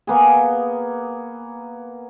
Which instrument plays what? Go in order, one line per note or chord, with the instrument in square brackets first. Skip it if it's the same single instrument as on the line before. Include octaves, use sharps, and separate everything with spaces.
[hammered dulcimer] A#3 B3 G#4